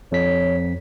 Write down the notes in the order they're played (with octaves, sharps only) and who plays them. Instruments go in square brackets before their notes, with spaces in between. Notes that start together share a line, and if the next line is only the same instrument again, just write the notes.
[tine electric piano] F2 B6 [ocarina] C#5